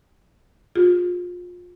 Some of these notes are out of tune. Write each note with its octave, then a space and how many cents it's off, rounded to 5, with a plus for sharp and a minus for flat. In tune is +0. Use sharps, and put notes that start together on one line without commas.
F4 +30 G#4 -35